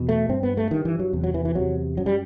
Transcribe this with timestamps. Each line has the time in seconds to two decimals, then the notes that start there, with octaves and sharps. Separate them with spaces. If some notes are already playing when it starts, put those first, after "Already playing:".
Already playing: E2 B2
0.09 A3
0.29 G2 C4
0.43 B3
0.57 A3
0.71 G2 D#3
0.85 E3
0.99 F#3
1.13 E2 C3
1.24 F#3
1.34 E3
1.45 E3
1.55 E2 C3 F#3
1.97 F#2 F#3
2.06 G3